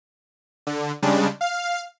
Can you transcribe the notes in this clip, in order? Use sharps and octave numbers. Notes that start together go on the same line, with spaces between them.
D3
C#3 G3 G#3 D4
F5